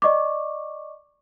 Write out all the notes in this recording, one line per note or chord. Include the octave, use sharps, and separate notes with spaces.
D5 D#5 C#6 D6